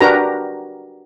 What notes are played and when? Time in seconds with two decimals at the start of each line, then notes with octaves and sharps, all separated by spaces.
0.01 D4 F#4 G4 A#4 B4 A#5